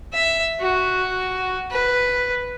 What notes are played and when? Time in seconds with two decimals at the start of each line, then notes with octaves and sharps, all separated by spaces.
0.13 E5
0.60 F#4
1.71 B4